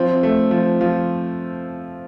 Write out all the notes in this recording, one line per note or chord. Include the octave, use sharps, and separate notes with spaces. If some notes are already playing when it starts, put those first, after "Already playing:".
Already playing: F3 C4
A3
F3
F3